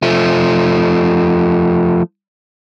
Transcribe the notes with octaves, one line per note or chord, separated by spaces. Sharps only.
F3 A3